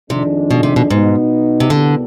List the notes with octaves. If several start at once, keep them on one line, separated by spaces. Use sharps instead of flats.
F2 C3 D#3 G#3 D4
B2
C3
B2
G#2 B2 B3 D#4
C3
C2 B2 D3 G3 B3